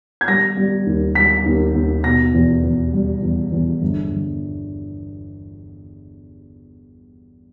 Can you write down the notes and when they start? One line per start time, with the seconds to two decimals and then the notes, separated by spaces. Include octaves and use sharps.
0.21 G#6
0.28 G3 A#6
0.57 G3
0.87 D#2
1.15 G3 B6
1.46 D#2
1.74 D#2
2.04 B2 A#6
2.34 E2
2.63 E2
2.93 G3
3.22 E2
3.52 E2
3.81 G1
4.11 G1